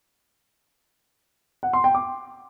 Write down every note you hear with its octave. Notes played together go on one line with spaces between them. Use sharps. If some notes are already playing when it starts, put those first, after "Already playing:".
F#5
C6
G5
D6